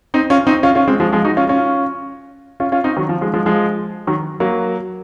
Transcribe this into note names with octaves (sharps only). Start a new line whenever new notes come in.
C4 D#4
C#4 F4
C4 D#4
C#4 F4
C#4 F4
G#3 C4
F3 G#3
F3 G#3
D#4 F#4
C#4 F4
C#4 F4
C#4 F4
C#4 F4
C4 D#4
D#3 F#3
F3
F3 G#3
F3 G#3
F3 G#3
D#3 F#3
F#3 A#3